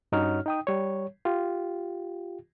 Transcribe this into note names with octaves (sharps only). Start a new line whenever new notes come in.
G2 C#4 D#4 F#4 C#5 F6
D#4 G5 D#6
G3 C#5
F4 G4